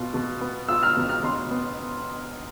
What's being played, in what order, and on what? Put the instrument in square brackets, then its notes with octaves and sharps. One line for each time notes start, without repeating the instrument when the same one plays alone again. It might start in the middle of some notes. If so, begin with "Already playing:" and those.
Already playing: [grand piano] B2 F4
B2
B3
[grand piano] F4 [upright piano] E6
[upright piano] F6
[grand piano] B2
[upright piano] F6
[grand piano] B2 [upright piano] C6
[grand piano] B3